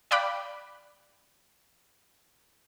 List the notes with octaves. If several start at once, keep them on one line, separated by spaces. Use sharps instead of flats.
D5 F5 G5 B5 D6 F#6